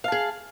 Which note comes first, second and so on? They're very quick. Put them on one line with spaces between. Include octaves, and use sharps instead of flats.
F5 A5 G#4